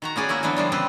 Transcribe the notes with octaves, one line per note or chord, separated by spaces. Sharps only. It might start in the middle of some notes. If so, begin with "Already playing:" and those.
D#3 F#4 A#5
B3 C#4 G#4 D5
A#3 E4 F#4
D3 E3 F#3 B3
F3 G3 D4
C#3 G3 C4 B4